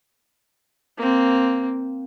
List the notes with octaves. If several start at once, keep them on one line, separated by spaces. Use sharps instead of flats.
A#3 C4